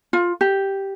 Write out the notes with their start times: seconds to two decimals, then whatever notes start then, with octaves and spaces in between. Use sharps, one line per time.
0.13 F4
0.41 G4